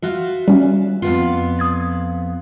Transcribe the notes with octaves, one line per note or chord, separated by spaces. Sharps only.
F4 F#4 E5
G3 C#4
F2 B3 F4
D#6 G#6 A6